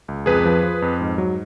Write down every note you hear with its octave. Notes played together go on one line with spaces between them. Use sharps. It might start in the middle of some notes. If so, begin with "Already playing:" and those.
C#2
F2 G#4 B4
F3
F3
F2
G#2
F#3